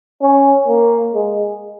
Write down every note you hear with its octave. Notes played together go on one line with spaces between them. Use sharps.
C#4
A#3
G#3